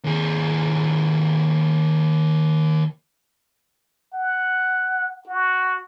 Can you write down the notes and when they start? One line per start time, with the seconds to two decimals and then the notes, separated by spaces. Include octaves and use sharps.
0.04 D#2 G#4
4.14 F#5
5.27 F#4